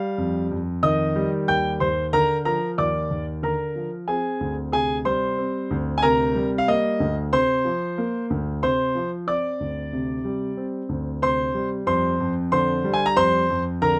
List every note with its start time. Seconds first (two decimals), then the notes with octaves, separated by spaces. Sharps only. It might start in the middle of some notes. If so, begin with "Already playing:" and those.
Already playing: G3 F5
0.18 F2
0.51 F2
0.83 D#3 D#5 D#6
1.16 G3
1.48 D#2 G5 G6
1.80 D#2 C5 C6
2.13 D3 A#4 A#5
2.45 F3 A#4 A#5
2.78 D#2 D5 D6
3.11 D#2
3.43 D3 A#4 A#5
3.76 F3
4.08 C4 G#4 G#5
4.41 D2
4.72 C3 G#4 G#5
5.05 G3 C5 C6
5.38 C4
5.71 D2
5.98 G#5
6.02 C3 A#4 A#5
6.35 G3
6.58 F5
6.68 A#3 D#5
7.00 D2
7.33 C3 C5 C6
7.65 F3
7.98 A#3
8.30 D2
8.63 C3 C5 C6
8.95 F3
9.27 C4 D5 D6
9.60 D2
9.93 C3
10.25 G3
10.57 C4
10.89 D2
11.22 C3 C5 C6
11.55 G3
11.87 F2 C5 C6
12.20 F2
12.52 D3 C5 C6
12.84 G3
12.94 G#5
13.06 A#5
13.16 F2 C5 C6
13.50 F2
13.82 D3 A#4 A#5